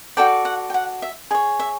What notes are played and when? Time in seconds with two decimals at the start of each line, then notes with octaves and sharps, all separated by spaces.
0.17 F#4 A4 D5 G5
0.45 F#5
0.70 G5
0.74 F#5
1.02 E5
1.31 G#4 D#5
1.35 C#5
1.59 E5